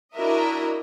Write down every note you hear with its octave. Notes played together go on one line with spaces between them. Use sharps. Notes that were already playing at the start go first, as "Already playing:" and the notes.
D4 E4 F#4 A#4 D#5 E5